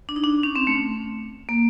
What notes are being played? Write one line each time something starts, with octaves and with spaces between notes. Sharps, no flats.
D4
D#4
D4
C#4
C4
A3
A#3